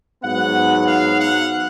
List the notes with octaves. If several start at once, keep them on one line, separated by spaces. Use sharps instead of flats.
G#2 F#3 B3 F#5
F5
F#5